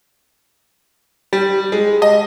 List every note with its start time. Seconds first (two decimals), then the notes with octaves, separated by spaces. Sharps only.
1.33 G3
1.72 G#3
2.02 D#5